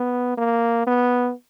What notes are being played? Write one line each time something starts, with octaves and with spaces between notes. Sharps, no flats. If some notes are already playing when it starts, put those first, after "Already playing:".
Already playing: B3
A#3
B3